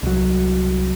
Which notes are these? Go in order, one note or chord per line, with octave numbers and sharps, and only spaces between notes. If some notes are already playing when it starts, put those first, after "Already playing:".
C2 F#3